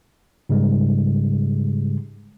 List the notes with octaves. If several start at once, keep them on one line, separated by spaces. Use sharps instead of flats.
G#2 C#3 G3 G#3